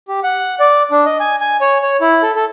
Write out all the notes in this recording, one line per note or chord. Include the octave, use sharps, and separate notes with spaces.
G4
F#5
D5
D4
D#5
G#5
G#5
C#5
C#5
E4
A4
A4